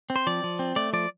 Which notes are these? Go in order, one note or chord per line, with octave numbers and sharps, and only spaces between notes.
C4
C5
F3 D5
F3
C4
A3 D5
F3 D5